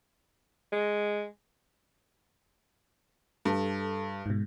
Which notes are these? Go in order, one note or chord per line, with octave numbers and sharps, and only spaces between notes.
G#3
G2 A4
G#2 B2